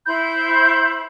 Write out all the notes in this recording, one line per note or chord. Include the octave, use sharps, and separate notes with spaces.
E4 C5 B5 G6